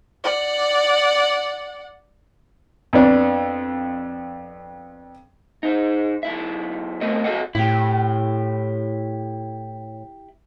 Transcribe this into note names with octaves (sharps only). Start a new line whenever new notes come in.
D5 F#5
F2 B3 D4
G#2 D#4
B1 E4 E5
C2 C3 A3 B3 A#4 D#5
F#4 A4 C5 D#5 F#5
A2 E4 G4